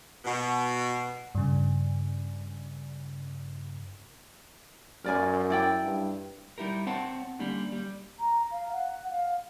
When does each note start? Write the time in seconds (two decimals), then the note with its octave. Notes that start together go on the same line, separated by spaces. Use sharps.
0.25 B2
1.35 G2 C#3
5.04 F#2 A#4 D5 G#5
5.50 E4 D5 G5
5.83 G2
6.58 G3 D#4 E4 G4 A#4
6.87 C4 C#5 F#5 G5 A5
7.39 D3 G3 A#3 C#4 D#4
7.72 G3
8.20 A#5
8.51 F5
8.73 F#5
9.10 F5